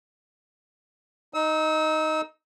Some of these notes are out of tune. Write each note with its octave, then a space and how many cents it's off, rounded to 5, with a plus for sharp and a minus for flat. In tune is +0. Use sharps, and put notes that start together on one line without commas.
D#4 +0 E6 -40